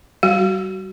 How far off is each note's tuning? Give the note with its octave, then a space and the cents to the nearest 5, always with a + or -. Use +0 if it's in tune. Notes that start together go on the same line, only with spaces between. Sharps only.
G3 -25 F#4 +20